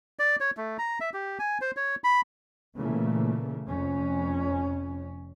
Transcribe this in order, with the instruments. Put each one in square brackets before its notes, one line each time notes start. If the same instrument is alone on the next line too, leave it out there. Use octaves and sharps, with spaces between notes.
[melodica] D5
C#5
A3
A#5
E5
G4
G#5
C5
C#5
B5
[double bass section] A#2 C#3 E3 A3 A#3
F1 F2 C#4